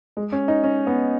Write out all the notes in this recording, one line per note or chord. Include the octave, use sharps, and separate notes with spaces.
G#3
C#4
D#4
C#4
B3